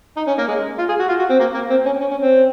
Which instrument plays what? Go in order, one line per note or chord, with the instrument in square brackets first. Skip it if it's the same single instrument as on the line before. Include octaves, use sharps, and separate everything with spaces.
[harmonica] D#4
C#4
A#3
G#3
F4
G#4
F#4
F4
F#4
C4
A#3
A#3
C4
C#4
C#4
C#4
C4